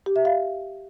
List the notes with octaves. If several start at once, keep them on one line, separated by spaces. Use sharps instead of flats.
G4
E5
F5